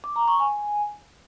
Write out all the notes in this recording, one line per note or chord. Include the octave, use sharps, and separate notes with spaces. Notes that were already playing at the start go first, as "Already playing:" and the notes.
D6
A#5
C#6
G#5